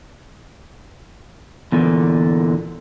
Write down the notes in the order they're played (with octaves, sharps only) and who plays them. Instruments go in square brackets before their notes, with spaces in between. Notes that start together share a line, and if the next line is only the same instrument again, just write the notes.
[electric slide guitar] E2 A#2 D3